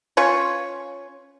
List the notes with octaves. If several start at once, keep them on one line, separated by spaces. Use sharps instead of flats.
C#4 F4 C#5